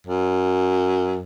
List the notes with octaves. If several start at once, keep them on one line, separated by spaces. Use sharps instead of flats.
F#2